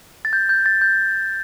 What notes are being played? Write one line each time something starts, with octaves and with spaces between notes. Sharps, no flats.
A6
G6
G6
A6
G6